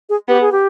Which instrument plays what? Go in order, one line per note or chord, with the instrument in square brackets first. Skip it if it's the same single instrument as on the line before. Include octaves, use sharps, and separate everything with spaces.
[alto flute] G#4
[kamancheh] B3 [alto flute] G4
[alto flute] G#4
G4